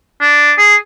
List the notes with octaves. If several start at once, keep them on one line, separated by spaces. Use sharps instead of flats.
D4
G#4